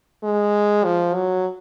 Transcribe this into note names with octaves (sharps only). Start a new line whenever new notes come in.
G#3
F3
F#3